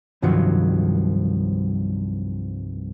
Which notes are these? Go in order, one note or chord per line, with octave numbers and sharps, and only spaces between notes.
C2 G2 D#3 F3 F#3